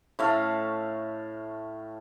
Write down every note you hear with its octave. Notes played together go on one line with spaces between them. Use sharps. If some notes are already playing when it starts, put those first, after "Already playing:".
A2 A3 F5